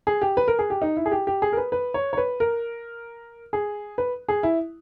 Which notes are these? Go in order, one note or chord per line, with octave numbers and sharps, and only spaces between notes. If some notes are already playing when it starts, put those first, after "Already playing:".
G#4
G4
B4
A#4
G#4
G4
D#4
E4
G#4
G4
G4
G#4
A#4
B4
B4
C#5
C#5
B4
A#4
G#4
B4
G#4
E4